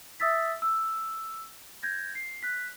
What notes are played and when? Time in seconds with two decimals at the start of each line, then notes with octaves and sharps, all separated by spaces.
0.20 E5 D#6 E6 A6 B6
0.62 E6
1.83 G6 G#6 A#6
2.15 C7
2.43 F#6 B6